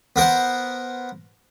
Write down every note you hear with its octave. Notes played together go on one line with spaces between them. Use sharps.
B3 A#4 C5 F#5